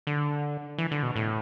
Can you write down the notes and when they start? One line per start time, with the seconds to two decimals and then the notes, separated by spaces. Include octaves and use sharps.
0.07 D3
0.78 E3
0.91 D3
1.03 B2
1.16 A2